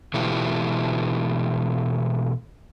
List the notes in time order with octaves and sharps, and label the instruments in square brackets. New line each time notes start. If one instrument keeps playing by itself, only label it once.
[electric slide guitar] B2 E3 G#3 A3 F4 G4